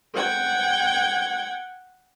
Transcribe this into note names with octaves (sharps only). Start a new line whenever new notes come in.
F#5 G5 G#6